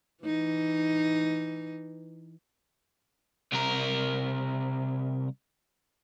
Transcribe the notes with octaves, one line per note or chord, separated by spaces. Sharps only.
E3 D#4
C2 A#4